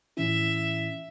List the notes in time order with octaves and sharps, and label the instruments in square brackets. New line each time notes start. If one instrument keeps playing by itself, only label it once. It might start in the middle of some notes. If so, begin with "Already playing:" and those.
[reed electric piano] A2 E3 C#4 E4 [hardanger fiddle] E5